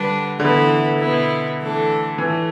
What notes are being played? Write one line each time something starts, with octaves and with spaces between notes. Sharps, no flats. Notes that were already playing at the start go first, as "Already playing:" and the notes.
Already playing: D3 G3 D4 B4
A2 D3 E3 B3 E4 B4
B2 B3 E4
E3 A3 D4 A4
A2 E3 A3